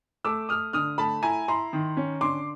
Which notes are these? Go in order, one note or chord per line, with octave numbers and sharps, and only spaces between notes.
A3 D6 E6
A3 D#6 F6
D3 D#6 F6
A3 A5 B5
E4 G#5 A#5
E4 A#5 C6
D#3
C#4
D3 C6 D6